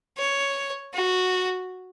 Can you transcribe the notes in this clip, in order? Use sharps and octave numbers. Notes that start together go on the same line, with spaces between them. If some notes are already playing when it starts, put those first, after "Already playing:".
C#5
F#4